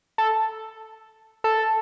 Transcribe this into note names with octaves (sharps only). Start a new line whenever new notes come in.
A4
A4